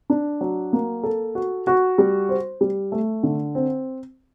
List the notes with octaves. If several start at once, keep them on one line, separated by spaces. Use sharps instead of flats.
D4
F#3
A#3
A4
F#4
F#4
G3
C5
G3
A3
D3
C4